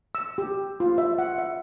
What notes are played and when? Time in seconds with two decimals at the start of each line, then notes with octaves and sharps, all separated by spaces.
0.15 E6
0.38 G4
0.80 F4
0.98 E5
1.18 F#5
1.38 E5